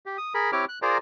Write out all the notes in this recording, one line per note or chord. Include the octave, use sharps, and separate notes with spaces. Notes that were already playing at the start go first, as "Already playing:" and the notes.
G4
D#6
G#4 A#4 B5
C4 E4 G4 C#5 D6 F6
F#6
F4 G#4 A#4 C5 D5 A#5